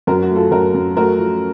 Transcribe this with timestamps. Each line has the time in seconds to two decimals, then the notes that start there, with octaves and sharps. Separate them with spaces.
0.07 F#2 F#4 A#4
0.22 F#4
0.30 A3
0.36 F4 A4
0.51 F#2 F#4 A#4
0.74 F#2
0.96 A3 F#4 A#4
1.18 F3